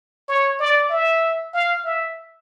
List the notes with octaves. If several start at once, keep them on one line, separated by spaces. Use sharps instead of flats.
C#5
D5
E5
F5
E5